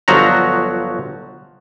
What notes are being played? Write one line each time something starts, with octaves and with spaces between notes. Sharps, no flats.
G1 F3 F#3 F#4 A#5